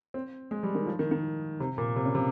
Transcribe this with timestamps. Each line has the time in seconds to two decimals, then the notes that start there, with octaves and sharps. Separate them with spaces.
0.14 C4
0.51 G#3
0.63 G3
0.75 D#3
0.87 F3
0.99 D#3
1.11 D#3
1.60 C3
1.78 A#2
1.96 C3
2.05 C#3
2.15 C3